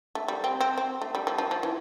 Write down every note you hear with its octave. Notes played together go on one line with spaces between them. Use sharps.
A3
G3
C4
C4
C4
A3
G3
F3
F3
F3
E3